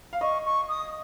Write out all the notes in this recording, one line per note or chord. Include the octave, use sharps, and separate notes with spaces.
F5
D#5 C#6
C#6
D#6